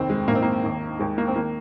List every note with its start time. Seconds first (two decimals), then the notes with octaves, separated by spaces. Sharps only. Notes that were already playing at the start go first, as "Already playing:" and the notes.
Already playing: F1 D#2 D#3 C4
0.10 G#3
0.27 A#1 G#2 D#3 A#3
0.35 C4
0.42 A#3
0.63 D#2 D#3
0.99 D#2 D#3 G#3
1.18 A#3
1.28 C4
1.36 D#3 A#3